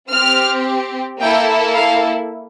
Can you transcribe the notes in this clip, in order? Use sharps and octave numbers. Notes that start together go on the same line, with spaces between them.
C4 G4 F6
A#3 E4 A4 G5
F5